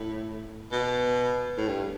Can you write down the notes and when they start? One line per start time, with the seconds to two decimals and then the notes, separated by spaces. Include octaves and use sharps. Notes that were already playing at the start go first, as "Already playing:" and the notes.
Already playing: A2
0.72 B2
1.58 A2
1.68 G2